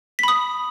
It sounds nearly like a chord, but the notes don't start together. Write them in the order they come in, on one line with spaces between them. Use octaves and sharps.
B6 B5 D#6